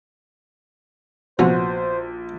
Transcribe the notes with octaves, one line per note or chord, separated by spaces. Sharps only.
A#1 C3 F3 B3 F#4 C5